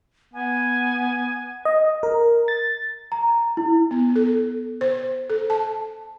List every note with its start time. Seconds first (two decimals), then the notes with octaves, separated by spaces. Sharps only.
0.33 B3 G#5
1.65 D#5
2.03 A#4
2.48 A6
3.12 A#5
3.57 E4
3.91 B3
4.16 A4
4.81 C5
5.30 A4
5.50 A5